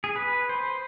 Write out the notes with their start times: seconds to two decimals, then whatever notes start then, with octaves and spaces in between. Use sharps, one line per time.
0.04 G#4
0.16 B4
0.49 C5